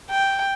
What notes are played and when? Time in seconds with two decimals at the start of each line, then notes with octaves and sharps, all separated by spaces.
0.11 G5